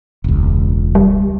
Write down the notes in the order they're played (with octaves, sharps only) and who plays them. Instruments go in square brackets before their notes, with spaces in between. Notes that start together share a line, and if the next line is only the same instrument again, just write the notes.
[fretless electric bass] E1 C#2
[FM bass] G3